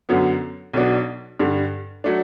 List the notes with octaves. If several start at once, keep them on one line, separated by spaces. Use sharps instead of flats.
F#2 D3 F#3 B3
B1 B2 F#3 B3 D4
G2 D3 G3
F#3 A3 D4